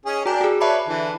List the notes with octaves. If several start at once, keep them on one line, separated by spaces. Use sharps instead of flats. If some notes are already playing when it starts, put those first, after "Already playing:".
C#4 D#4 G#4
D4 F#4 A#4 G5 G#5
F#4 G#4
B4 C#5 D5 E5 A5 B5
D3 E3